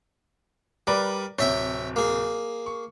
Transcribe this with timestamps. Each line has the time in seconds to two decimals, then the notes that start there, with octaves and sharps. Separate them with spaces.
0.87 G3 A#4 B4 D5
1.39 D1 C3 C#5 E5 G5
1.96 A#3 G#4
2.66 C#6